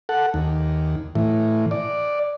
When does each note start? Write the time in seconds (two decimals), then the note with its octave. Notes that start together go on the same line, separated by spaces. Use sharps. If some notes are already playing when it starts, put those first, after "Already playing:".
0.09 A4 F#5
0.34 D#2
1.15 A2 E3
1.71 D5